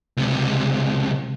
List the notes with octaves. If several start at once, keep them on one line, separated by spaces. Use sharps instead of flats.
C#2 C3